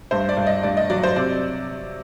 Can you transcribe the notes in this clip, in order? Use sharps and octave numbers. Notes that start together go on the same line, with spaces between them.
G2 C5
D5
G2
D#5
G2 D5
D#5
F#3 D5
C5
C3 D5